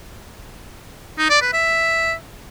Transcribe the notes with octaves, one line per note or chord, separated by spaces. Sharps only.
D#4
D5
B4
E5